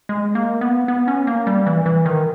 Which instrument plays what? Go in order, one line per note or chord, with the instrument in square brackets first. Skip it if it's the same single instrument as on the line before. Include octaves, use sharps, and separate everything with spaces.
[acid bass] G#3
A#3
B3
B3
C#4
A#3
G3
E3
E3
D#3